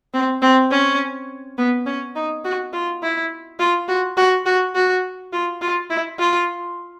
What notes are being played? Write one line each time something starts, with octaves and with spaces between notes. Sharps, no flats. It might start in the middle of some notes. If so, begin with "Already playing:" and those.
C4
C4
C#4
B3
C#4
D#4
F#4
F4
E4
F4
F#4
F#4
F#4
F#4
F4
F4
E4
F4